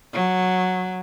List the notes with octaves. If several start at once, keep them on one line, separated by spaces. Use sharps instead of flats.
F#3